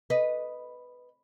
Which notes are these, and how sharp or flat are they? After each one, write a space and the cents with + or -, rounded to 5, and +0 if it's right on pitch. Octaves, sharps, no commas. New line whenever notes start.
B4 +0 D#5 +0